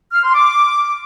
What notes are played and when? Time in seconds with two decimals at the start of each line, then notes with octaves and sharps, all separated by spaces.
0.12 F6
0.23 C6
0.34 D6